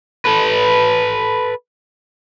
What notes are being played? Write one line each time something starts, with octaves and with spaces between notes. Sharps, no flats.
A4 B4